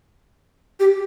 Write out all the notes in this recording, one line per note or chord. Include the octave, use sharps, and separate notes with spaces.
G4